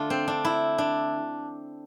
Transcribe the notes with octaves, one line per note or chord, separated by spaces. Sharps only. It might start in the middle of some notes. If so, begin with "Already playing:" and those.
Already playing: D3 A3 D4 F4
C4
D4
E4
D4